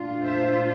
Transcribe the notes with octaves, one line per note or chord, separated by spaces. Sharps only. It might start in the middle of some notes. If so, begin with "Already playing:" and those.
Already playing: A#2 A3 D4 F4
C5 E5